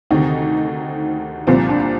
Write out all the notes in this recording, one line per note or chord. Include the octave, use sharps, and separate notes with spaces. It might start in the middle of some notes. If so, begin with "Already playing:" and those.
D2 C3 D#3 D#4
C2 A#2 F3 C4
D4